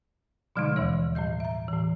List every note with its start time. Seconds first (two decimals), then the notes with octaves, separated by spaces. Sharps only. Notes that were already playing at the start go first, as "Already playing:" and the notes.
0.56 B2 D3 F3 G3 G#3 D#4
0.76 D#2 B2 E3 C#5
1.15 A2 G3 D#5 G6
1.40 E5 A#5
1.68 A2 E3